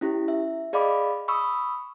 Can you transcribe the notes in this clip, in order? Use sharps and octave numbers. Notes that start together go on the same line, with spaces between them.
C#4 E4 G4
E5
G#4 D5 D#5 F5 B5 D6
B5 C#6 D#6 E6